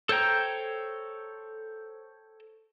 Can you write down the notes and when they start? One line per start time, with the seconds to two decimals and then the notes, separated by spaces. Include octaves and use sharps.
0.09 A4 C5 C#5 G5 A#5